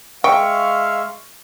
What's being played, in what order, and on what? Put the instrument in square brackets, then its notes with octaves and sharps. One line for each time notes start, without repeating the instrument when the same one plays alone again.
[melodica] G#3 E5 [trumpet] F5 [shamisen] G5 [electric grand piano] C#6